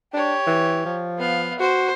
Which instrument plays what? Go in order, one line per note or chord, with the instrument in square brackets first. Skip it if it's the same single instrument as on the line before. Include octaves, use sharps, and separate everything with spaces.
[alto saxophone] D4 [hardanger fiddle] G4 C#5
[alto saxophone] E3
F3
[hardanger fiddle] B3 F5
[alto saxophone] F#4 [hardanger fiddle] C5